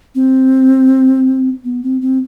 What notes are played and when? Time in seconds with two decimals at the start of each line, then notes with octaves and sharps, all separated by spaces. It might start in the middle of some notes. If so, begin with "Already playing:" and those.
0.15 C4
1.64 B3
1.83 C4
2.01 C4